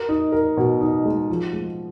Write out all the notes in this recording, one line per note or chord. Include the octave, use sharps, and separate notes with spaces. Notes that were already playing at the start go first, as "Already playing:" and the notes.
Already playing: A#4
D#4
A#4
B2
D#4
G#3
F3
G#3